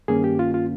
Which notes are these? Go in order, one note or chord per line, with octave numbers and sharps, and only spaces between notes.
G2 D#3 A#3 C#4 G#4
G4
F4
F4